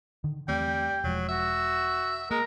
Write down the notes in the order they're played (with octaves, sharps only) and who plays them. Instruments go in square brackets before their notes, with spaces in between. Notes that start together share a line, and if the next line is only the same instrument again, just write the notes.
[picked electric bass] D3 D#3
[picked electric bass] E2 A3 C4 [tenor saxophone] G3 [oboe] G5
[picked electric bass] E1 F3 G#3 [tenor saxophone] F#3
[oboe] F#4 [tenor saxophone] E5
[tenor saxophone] G#3 [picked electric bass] A#3 [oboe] A#4